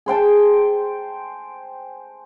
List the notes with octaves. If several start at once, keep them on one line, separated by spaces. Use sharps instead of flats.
G#4 C5 G5 A5